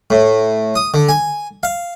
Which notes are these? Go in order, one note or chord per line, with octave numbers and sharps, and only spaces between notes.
A2
D#6
D3
G#5
F5